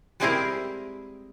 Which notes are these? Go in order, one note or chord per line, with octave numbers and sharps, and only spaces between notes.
G3 G#3 C4 E4 G#4 A#4